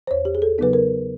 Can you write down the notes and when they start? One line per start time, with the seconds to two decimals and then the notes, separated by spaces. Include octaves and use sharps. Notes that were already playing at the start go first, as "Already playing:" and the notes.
0.07 C5
0.11 E2 C#5
0.25 G4
0.35 G#4
0.42 A4
0.58 C#3 F#3 B3 D#4 B4
0.73 A#4